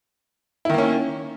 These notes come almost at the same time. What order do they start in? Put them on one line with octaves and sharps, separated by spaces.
E4 D#3 A#3 C#4